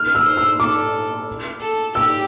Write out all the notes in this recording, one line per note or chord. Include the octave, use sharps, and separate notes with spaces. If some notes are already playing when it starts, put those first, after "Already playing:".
Already playing: F6
E6
C5
E6
A4 D6
A4
G4 E6